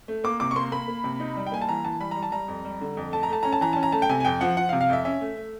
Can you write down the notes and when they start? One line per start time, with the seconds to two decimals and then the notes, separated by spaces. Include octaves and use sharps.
0.08 A3
0.24 A#3 D6
0.40 C3 D6
0.51 C#6
0.56 A#3 C6
0.72 A#3 B5
0.88 A#3
1.04 C3
1.20 D#4
1.37 G3
1.46 G5
1.52 A#3 G#5
1.62 A5
1.69 E3 A#5
1.84 E3 A5
2.00 G3 B5
2.11 G3 A#5
2.23 A5
2.32 G3 A#5
2.48 F2
2.65 G3
2.81 D3
2.97 F2
3.13 A3 A5
3.23 A#5
3.29 A3 A5
3.43 C#4 A#5
3.52 A5
3.61 E3 A#5
3.73 C#4 A5
3.83 A#5
3.92 A3 A5
4.02 G5
4.09 C3 G#5
4.20 G#5
4.25 F2 G5
4.41 F3 F#5
4.57 F3 F#5
4.69 F5
4.73 C3
4.81 F5
4.90 F2 E5
5.05 C#4 E5
5.21 A3
5.37 A3